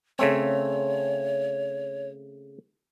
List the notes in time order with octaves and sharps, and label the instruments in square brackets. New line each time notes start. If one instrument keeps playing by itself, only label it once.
[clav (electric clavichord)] C#3 A3 C4 [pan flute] C#5